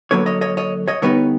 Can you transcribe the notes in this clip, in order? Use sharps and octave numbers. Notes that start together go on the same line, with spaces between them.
D3 F#3 A#3 B4 C#5
C#5 D#5
C#5 D#5
C#5 D#5
C#5 D#5
D3 G3 B3 D#4 B4 C#5